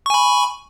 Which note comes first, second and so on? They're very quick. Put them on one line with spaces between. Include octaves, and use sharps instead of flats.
C#6 G#5 B5